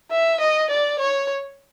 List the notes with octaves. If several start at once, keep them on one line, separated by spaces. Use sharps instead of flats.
E5
D#5
D5
C#5